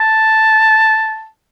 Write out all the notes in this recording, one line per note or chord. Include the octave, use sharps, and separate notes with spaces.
A5